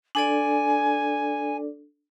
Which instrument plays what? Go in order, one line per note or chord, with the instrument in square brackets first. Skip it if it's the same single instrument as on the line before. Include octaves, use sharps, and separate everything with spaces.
[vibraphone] D4 A4 D5 [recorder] G#5